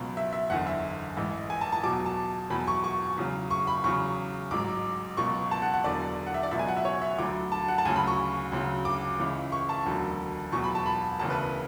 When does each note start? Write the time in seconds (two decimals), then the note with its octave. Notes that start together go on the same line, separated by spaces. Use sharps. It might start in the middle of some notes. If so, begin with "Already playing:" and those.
Already playing: C#2 B2 F#3
0.17 E5
0.33 E5
0.50 F#1 E2 D3 F#5
0.67 E5
1.17 A1 G#2 E3
1.50 G#5
1.61 A5
1.72 A5
1.84 E2 B2 F#3 D6
2.06 A5
2.50 E2 B2 F#3 B5
2.67 C#6
2.84 C#6
3.18 E2 C#3 F#3
3.51 C#6
3.67 B5
3.84 E2 C#3 F#3 C#6
4.51 A1 G#2 F#3 D6
5.17 C#2 B2 F#3 C#6
5.51 A5
5.62 F#5
5.74 F#5
5.84 E1 E2 D3 F#3 D5
6.27 F#5
6.34 E5
6.43 D5
6.51 C#2 B2 F#3 E5
6.59 G#5
6.68 F#5
6.77 E5
6.85 C#5
7.02 E5
7.18 D2 D3 F#3 D6
7.52 A5
7.68 F#5
7.78 A5
7.85 D2 C#3 F#3 G#5
7.96 B5
8.07 C#6
8.52 D2 C#3 F#3
8.85 D6
9.19 C#2 C#3 E3
9.52 C#6
9.69 A5
9.86 E1 D2 D3 F#3
10.52 E2 B2 F#3 C#6
10.64 B5
10.75 A5
10.86 B5
11.19 E1 D2 C#3 E3 A5
11.30 B4